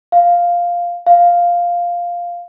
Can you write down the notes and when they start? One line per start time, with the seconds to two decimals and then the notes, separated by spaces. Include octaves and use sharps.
0.12 F5
1.06 F5